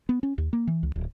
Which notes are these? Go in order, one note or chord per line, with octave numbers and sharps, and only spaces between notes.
B3
C#4
D#2
A#3
E3
C#2
D1